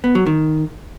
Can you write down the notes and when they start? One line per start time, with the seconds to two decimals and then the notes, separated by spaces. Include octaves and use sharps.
0.04 B3
0.15 F#3
0.26 D#3